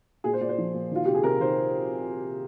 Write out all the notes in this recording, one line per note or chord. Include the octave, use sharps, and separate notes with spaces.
A#2 G#4
C5
A#2 D5
C5
F3
A#2
D#3 F4
C3 G4
G#4
C3 A#4
D#3 C5